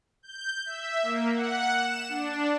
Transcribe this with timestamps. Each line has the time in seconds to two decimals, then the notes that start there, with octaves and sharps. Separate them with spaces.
0.23 G6
0.66 E5
1.03 A#3
1.33 F#5
1.77 E7
2.09 D4